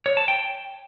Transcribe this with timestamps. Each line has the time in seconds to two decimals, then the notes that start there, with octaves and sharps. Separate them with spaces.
0.06 C#5
0.17 A5
0.28 G5